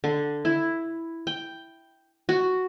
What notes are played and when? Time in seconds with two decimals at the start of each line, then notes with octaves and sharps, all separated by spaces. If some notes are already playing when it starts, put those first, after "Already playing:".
0.04 D3
0.45 E4
1.27 G5
2.29 F#4